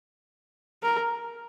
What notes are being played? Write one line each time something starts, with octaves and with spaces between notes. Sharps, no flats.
A#4